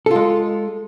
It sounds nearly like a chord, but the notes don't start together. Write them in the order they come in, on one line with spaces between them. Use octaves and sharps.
A4 F4 G#3